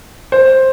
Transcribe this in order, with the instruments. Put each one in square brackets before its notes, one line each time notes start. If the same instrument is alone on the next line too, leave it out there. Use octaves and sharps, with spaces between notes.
[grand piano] C5